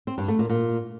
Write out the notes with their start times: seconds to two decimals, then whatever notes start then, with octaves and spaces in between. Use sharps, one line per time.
0.07 C4
0.18 G2
0.28 A3
0.39 A#2
0.49 A#2